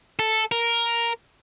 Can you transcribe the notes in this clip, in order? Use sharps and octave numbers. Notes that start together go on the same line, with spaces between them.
A4
A#4